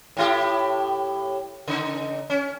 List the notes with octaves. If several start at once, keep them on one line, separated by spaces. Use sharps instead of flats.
A2 E4 G4
C#3 D#4
C#4